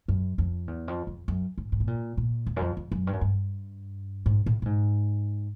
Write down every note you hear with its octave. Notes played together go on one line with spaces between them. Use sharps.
F#2
F2
E2
F2
F2
F#2
G#2
G#2
B2
A#2
A#2
E2
F#2
F2
F2
F#2
G2
F#2
G2
G#2
A2
A2
G#2